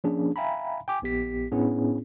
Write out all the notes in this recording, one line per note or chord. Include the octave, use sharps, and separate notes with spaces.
F3 A#3 C#4 D4 G#4
E5 F5 G5 G#5 A#5 B5
G5 G#5 D6
A#1 B3 G4 B6
A2 B3 C#4 D4 E4 G#4